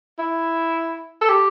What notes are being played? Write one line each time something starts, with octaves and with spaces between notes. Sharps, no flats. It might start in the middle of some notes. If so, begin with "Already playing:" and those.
E4
A4
G4